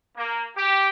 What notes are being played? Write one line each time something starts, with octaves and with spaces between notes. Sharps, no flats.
A#3
G4